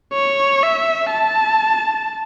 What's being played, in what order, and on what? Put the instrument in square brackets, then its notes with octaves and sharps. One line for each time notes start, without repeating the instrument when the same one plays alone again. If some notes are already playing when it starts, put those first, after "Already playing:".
[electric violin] C#5
E5
A5